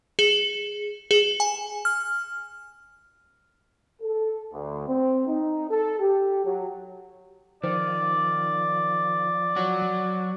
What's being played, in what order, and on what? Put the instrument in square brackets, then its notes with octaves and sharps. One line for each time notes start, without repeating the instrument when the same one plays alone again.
[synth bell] G#4
G#4
G#5
F6
[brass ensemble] A4
D2
C4
D#4
A4
G4
F#3
[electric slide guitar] D#3 [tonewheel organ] F3 [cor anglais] D5
[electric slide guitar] F#3 F#4